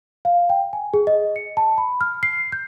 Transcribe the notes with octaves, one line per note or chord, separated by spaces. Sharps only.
F5
G5
G#5
G#4
D#5
C#7
A5
B5
F6
C7
G6